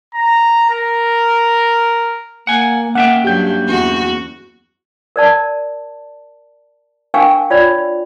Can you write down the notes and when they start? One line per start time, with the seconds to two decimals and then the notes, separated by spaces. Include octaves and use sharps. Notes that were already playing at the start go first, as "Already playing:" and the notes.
0.15 A#5
0.70 A#4
2.47 A#3 F#5 G#5
2.95 A#3 C#4 E5 F#5 G5
3.24 G2 F#3 G4 G6
3.68 E2 F#4
5.16 A#4 D5 A5
7.14 D4 A#4 F5 G5 G#5 C#6
7.50 F4 C#5 D5 B5